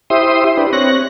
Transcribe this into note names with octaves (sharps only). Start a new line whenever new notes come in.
E4 G4 C5 E5 C6 D#6
D4 G4 B4
C4 C#5 F#6 A#6